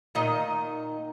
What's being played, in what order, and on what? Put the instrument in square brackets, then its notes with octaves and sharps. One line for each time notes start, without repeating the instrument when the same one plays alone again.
[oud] A#2 D#3 D#5